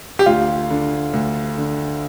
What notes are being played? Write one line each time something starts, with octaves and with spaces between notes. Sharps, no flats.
G4
D2 F4
D3
D2
D3